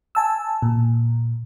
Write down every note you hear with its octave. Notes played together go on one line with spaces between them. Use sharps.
G#5 A5 E6
A#2